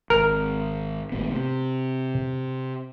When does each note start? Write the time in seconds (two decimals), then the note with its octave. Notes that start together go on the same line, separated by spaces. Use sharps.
0.10 G#1 A#4
1.12 G#1 A2 B3
1.31 C3